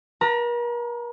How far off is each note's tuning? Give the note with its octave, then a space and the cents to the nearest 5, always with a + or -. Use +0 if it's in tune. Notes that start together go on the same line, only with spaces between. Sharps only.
A#4 +45 A#5 -30